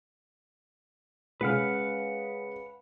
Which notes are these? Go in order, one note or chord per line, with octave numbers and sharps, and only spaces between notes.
C#3 G#3 B4 F#5 F6